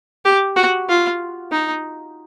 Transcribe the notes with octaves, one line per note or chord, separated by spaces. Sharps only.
G4
F#4
F4
D#4